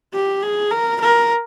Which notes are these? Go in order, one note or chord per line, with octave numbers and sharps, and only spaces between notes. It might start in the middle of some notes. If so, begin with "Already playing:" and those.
G4
G#4
A#4
A#4